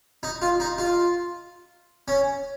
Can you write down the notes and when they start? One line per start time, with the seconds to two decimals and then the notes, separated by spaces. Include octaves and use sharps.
0.23 D#4
0.42 F4
0.60 D#4
0.78 F4
2.08 C#4